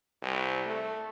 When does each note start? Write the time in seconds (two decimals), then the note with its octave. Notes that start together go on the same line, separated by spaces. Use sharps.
0.22 C2
0.66 A3